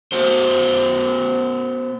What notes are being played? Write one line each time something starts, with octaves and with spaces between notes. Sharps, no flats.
B3 F#4 C5